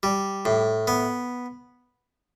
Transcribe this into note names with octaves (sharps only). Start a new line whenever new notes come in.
G3
A2
B3